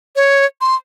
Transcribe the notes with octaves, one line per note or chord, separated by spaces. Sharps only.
C#5
C6